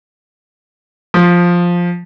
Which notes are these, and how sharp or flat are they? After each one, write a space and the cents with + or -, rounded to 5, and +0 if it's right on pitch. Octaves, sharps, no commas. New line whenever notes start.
F3 +5